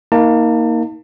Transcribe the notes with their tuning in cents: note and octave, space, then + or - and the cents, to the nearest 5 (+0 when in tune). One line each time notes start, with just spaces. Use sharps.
A#3 +0 D#4 +30 A5 +35